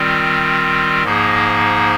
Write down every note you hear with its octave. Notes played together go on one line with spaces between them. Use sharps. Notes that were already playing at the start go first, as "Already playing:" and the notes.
Already playing: D#3 G3 C4 F4
G#2 F3 A#3 D#4 G#4